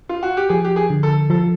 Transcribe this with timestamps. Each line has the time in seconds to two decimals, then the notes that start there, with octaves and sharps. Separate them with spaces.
0.09 F4
0.23 F#4
0.37 G4
0.49 F3 G#4
0.64 G4
0.76 G#4
0.90 D3
1.03 A4
1.30 F3 A4